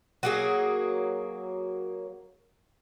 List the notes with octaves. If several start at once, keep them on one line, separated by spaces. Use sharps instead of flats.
F#3 A#3 G#4